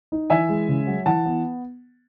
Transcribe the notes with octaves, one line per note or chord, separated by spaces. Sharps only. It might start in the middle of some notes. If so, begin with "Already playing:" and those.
D#4
E3 E5 G#5
G#3
C#3
F#3
E3 F#5 A5
B3